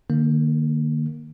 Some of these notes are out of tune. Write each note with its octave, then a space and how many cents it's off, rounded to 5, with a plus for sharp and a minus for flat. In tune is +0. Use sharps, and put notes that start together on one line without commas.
D3 +45 A#3 +0